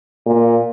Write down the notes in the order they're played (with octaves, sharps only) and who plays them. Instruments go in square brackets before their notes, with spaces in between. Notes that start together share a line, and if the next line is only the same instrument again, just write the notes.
[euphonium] A#2